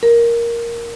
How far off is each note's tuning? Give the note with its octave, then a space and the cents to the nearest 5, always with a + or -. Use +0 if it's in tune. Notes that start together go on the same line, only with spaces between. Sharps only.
A#4 +5